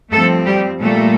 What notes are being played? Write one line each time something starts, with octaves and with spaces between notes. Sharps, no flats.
G2 F3 A3 C4 A4
G3 G4
A#2 G3 A3 A#3 A4